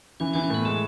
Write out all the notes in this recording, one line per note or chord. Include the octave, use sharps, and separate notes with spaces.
E3 C#4
E3 D4
C#4
A2 B3
G#3 A3